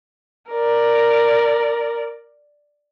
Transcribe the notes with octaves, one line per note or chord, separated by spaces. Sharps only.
A#4 D5